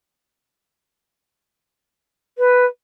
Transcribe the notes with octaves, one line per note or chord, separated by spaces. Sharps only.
B4